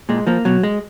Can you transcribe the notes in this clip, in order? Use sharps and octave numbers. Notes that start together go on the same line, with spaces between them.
A#2 G#3
F3 A#3
B2 F#3
G#3